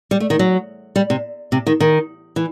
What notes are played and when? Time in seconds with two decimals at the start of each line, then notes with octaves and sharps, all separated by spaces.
0.11 G3
0.20 A3
0.30 D#3
0.39 F#3
0.96 G3
1.10 C3
1.52 C3
1.67 D#3
1.80 D#3
2.36 E3